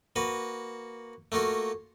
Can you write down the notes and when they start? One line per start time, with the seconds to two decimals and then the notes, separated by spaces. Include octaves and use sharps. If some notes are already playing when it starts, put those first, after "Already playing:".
0.16 A#3 F#4 B4
1.32 A3 A#3 F4 F#4